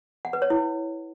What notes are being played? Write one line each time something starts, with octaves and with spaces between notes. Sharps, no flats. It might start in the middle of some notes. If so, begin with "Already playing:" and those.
F#5
B4
C#5
E4